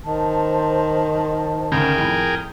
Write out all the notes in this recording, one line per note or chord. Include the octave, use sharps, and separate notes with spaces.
D#3 C5 A5
D2 C#3 G#4 A#4 G5
F2 A2